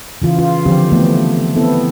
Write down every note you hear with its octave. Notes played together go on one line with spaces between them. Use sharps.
C#3 E3 F4
F4
D3 F3 C4 G4
E3 A3 B3
B3 C4 E4 A4